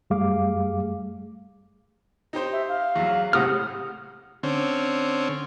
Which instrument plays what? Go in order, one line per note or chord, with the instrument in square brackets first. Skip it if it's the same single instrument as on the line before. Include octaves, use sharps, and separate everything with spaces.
[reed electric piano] F#2 G3 A3 G#4 F5 D6
[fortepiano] D#4 G4 C5
[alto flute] E5
F5
[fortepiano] E2 F#3
[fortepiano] A2 C3 G#3 [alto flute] G4 [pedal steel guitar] F#5 D#6 F6
[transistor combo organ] D3 C4 C#4